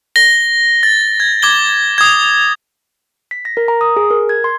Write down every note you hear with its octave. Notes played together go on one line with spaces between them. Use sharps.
A#6 G7
A6
G#6
D6 G#6 G7
D#6 G#6
B6
A#6
A#4
A#5
D#6
G#4
A#4
G#6
C6